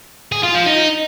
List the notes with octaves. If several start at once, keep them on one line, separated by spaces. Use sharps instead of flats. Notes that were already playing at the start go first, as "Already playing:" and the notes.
G#4
F4
F3
D#4